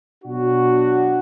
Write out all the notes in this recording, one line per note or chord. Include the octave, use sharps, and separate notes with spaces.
B2 F#3 D4 F#4